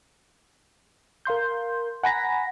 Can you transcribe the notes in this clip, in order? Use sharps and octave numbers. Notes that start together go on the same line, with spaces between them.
A#4 F5 C6 G6
F#5 G#5 A#5 B5 A#6 B6